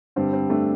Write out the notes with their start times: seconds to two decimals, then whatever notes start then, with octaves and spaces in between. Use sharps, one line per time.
0.16 G2 D3 G3 C4
0.33 C4
0.49 A3 D4